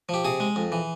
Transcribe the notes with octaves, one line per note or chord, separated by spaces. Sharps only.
F3 G4
C3 G#4
G#3
F2
E3